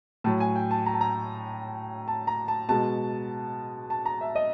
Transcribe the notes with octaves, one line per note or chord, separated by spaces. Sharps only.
A2 F#3 A5
G#5
G5
A5
A#5
A5
A#5
A5
A#5
A5
B2 G#3 A5
A5
A#5
E5
D#5